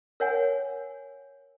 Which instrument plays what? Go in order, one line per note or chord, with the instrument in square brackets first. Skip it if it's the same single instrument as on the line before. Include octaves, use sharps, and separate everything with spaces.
[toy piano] A#4 C#5 F#5 G#5